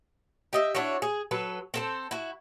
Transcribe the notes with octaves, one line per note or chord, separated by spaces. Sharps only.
G4 D#5 E5
D4 E4 F#4 C#5
G#4
F#3 A4 B4
C4 A4 C5
E4 F#4